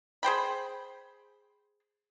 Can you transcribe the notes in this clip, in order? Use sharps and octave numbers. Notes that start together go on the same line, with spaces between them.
G#4 C5 G5 B5